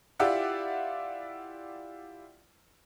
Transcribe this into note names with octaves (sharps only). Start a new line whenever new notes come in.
E4 F4 G4 D5 E5 F#5